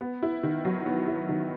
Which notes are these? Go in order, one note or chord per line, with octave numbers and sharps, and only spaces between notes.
B3
E4
D#3
F#3
B3
E4
D#3